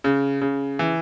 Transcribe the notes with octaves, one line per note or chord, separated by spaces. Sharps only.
C#3
C#3
E3